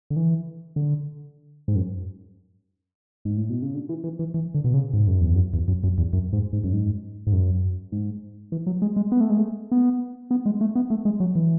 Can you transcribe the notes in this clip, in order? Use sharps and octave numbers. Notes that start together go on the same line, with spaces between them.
D3
E3
D3
G#2
F#2
G#2
A2
B2
C#3
D3
E3
E3
E3
E3
D3
B2
C#3
G#2
F#2
E2
F#2
E2
F#2
F#2
E2
F#2
G#2
G#2
F#2
G#2
G#2
F#2
G#2
E3
F#3
G#3
G#3
B3
A3
G#3
A3
B3
B3
G#3
A3
B3
A3
G#3
F#3
E3